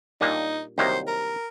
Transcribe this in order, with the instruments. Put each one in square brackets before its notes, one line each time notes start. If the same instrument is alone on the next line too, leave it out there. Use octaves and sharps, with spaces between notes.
[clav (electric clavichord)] A#2 G3 A#3 D4 [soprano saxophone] D#4
[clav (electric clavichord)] C2 C3 D#3 F#3 A#3 [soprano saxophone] C5
[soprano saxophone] A#4